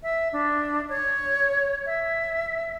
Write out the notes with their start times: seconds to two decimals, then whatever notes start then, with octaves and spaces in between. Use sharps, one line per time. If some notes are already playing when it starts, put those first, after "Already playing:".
0.03 E5
0.33 D4
0.89 C#5
1.86 E5